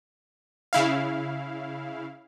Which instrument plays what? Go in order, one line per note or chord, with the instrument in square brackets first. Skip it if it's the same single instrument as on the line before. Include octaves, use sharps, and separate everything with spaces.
[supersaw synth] C#3 E4 F5